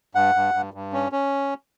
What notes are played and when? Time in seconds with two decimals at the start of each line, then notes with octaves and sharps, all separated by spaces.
0.15 G2 F#5
0.35 G2
0.54 G2
0.74 G2
0.93 C#4
1.12 C#4